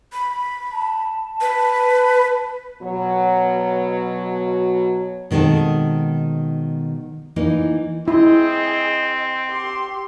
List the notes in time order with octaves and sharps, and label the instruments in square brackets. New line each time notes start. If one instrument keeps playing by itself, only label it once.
[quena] B5
[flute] A5
[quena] B4
[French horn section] B2 F#3
[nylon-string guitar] B2 D#3 G#3 C4 A4
E3 A#3 D#4
[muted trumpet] C4 [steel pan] E4 [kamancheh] G#4 D#5
[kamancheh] G4 C6